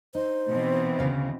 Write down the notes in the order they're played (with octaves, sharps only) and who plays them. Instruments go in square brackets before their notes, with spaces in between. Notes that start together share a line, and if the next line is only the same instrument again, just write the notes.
[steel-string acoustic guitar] D#4 [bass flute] C5
[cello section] B2 E3 C4
[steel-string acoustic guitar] D2 C#3 F5